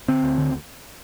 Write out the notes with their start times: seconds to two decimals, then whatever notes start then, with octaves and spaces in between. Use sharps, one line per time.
0.08 D3 C4
0.23 D2
0.38 D3